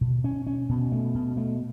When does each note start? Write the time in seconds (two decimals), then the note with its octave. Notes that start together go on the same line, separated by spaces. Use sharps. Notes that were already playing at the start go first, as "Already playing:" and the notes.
0.01 B2
0.24 C#4
0.47 C#4
0.69 B2
0.92 A3
1.15 B2
1.37 A3